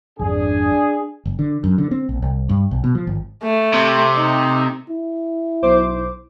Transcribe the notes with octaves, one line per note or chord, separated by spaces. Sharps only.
G#1 F2 D4 G#4
F#1
D3
F#2
D3
C4
A#1
C2
G2
B1
B2
F3
G#1
A3
C3
D#4
E4
B1 C5 D6